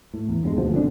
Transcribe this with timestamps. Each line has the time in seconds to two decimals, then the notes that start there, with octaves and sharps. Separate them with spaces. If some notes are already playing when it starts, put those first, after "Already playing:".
0.14 A2
0.29 E2
0.43 G2 F3 G#3
0.57 D2 B2 F3
0.72 G1 F2 D4